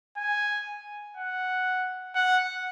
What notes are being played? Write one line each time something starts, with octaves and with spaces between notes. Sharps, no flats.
G#5
F#5
F#5